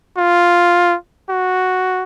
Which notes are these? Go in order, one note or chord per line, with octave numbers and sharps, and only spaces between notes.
F4
F#4